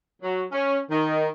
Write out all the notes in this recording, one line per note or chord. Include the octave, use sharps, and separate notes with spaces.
F#3
C#4
D#3